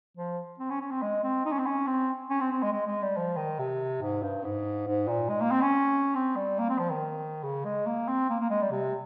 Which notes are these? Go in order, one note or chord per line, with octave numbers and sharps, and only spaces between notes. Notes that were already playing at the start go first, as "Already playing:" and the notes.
F3
C4
C#4
C#4
C4
G#3
C4
D#4
C#4
C4
C#4
C4
C#4
C4
C4
G#3
G#3
G#3
G3
F3
D#3
C3
G#2
G2
G#2
G#2
A#2
G#3
A#3
C4
C#4
C4
G3
A#3
C4
F3
D#3
C#3
G#3
A#3
C4
A#3
A#3
G#3
G3
C3